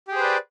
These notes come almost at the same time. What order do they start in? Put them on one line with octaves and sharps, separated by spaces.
G4 G#4 C5 B4 D5